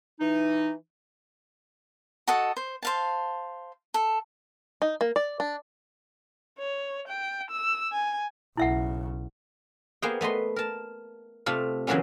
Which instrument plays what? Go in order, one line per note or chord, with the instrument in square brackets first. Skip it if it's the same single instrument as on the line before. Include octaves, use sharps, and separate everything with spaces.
[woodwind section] E3 D#4
[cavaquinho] F#4 A4 D#5 A5
C5
C5 F5 A5
A4
[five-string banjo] D#4
A#3
D5
D4
[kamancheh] C#5
G5
E6
G#5
[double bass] B1 C#3 [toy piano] E4 E5 F#5
[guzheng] A#3 B3 G#4 C5 F#5 G5
A3 B3 D#5 C6
A#4 A5
C3 A3 F4
C#3 E3 F#3 A#3 B3 C#4